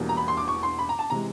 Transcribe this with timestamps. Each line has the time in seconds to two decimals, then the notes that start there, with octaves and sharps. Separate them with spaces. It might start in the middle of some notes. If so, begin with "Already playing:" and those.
Already playing: E1 E2 B2 G3 A#3
0.09 A#5
0.17 B5
0.28 C6
0.37 D6
0.48 C#6
0.63 C6
0.79 B5
0.89 A#5
0.99 A5
1.10 C3 E3 G#3 A#5